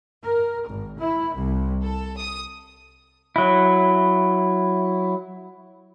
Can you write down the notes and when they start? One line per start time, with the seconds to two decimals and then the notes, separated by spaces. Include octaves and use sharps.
0.23 A#4
0.67 G#1
0.98 E4
1.35 C2
1.81 A4
2.17 D#6
3.36 F#3 E4